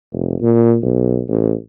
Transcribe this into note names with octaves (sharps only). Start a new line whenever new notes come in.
F1
A#2
B1
A1